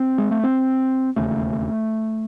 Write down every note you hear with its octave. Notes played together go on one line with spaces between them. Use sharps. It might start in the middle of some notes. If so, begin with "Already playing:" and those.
Already playing: C4
G#3
A3
C4
E1 D#2 C#3 A3